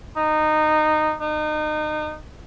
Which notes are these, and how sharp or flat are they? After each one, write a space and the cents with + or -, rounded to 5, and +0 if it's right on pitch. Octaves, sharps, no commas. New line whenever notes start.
D#4 -15
D#4 -30